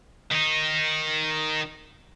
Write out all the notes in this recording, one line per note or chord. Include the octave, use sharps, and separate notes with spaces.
D#3 D#4